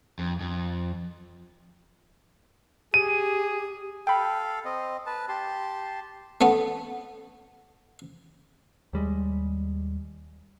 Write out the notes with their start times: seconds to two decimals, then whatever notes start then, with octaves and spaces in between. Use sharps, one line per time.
0.19 F2
0.41 F2
2.94 G4 G#4 D#7
4.07 A4 F5 G5 B5
4.65 C4 D#5
5.06 B4 A5
5.29 G4 A5 C6
6.41 A3 B3
8.93 D#2 G3 G#3